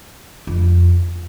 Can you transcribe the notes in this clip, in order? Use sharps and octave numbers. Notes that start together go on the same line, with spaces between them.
F2